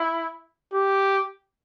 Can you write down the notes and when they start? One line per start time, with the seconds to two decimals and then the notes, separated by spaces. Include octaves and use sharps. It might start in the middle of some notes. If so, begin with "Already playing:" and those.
Already playing: E4
0.73 G4